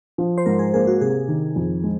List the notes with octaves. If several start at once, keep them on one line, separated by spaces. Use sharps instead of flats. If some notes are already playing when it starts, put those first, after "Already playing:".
F3
C5
G#2 A#4
G#4
A#3 G#4
F#4
C3 G#4
D#3
F2
G#3